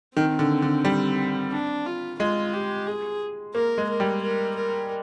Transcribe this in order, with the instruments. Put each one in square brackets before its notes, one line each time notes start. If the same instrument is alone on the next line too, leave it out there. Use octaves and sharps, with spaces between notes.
[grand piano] D#3 [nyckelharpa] C4
[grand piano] D3
D3
G3
[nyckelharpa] D4
F4
[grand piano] G#3 [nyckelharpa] F4
[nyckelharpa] G4
G#4
[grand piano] A#3 [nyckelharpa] A#4
[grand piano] G#3
[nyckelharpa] A#4
[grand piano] G3
[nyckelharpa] A#4
A#4